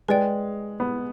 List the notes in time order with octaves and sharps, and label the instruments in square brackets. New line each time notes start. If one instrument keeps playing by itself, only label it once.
[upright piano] G#3 [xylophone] B4 D5 G5
[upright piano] B3